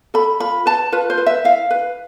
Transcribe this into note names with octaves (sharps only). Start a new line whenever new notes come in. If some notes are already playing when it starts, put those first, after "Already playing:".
A4 B5
F4 B5
B4 A5
F4 B4
C5
B4
E5
E4 F5
B4